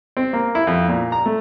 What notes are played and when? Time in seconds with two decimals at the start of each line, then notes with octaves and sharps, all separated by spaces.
0.17 C4
0.33 A#3
0.55 E4
0.67 F2
0.88 A#2
1.12 A#5
1.26 A3